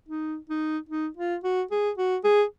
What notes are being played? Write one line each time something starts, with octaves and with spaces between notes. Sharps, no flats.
D#4
D#4
D#4
F4
F#4
G#4
F#4
G#4